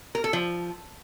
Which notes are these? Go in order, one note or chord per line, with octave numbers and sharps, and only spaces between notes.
A#4
A4
F3